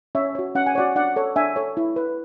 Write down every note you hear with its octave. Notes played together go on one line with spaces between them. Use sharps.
C#4 C#5 E5
F#4 C#5
C#4 F#5
G#5
F#4 C#5 D5 F#5
D4 D5 F#5
A4 C#5
D4 E5 G#5
A4 C#5
E4
B4